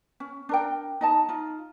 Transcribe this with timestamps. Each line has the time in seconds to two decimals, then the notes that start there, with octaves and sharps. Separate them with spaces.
0.20 C#4
0.49 D4 A#4 G5
1.01 D#4 D#5 A5
1.29 D#4 F4